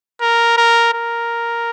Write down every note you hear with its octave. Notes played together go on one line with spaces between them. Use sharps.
A#4
A#4
A#4